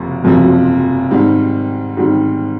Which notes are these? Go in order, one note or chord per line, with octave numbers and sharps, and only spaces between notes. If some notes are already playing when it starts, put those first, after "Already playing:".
Already playing: F#1 F2 C3 F3
F#1 F2 C3 F3
G#2 D#3 G3 C4
G#2 D#3 G3 C4